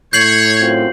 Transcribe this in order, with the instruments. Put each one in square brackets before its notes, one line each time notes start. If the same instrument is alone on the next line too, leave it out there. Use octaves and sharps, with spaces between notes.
[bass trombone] A2 [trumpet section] C#5 [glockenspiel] G6 C7 F#7
[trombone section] F#2 C4 F4